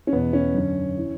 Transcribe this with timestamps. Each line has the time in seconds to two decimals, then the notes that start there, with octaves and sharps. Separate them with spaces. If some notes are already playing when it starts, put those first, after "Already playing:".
0.07 C#4
0.12 E2 B2 B3
0.33 C#4
0.54 F#2 D3
0.98 E3